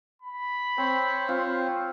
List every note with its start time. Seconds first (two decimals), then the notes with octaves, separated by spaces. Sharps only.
0.22 B5
0.78 C4 C5 C#5
1.28 C4 F4